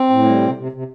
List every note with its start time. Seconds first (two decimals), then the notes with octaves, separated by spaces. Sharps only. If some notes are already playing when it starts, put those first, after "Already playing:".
Already playing: C4
0.10 A2
0.25 G3
0.41 C3
0.57 C3
0.72 C3